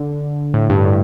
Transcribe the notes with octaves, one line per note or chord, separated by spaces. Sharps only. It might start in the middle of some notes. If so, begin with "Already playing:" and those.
Already playing: D3
A2
G2
A2